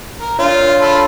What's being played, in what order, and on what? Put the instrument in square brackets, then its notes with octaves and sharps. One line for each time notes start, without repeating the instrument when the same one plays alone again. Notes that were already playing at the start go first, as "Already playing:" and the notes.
[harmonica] A#4
[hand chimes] D4 C#5 [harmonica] F4
[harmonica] F4 A4 B5